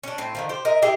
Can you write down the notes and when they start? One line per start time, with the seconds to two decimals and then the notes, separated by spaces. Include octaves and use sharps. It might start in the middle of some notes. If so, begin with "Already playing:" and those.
0.03 C#4 D4
0.18 A2 C4
0.35 D3 D#3 F3
0.49 G4 C5
0.65 A#4 D#5 E5
0.82 G#3 E4 G4 G#4